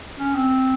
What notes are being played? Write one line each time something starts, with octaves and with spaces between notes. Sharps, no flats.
C#4
C4